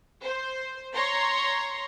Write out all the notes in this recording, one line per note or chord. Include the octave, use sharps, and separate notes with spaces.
C5
C#5 A#5 C6